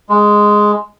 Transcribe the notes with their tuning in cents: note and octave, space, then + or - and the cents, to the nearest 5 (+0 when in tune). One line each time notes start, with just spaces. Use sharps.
G#3 +0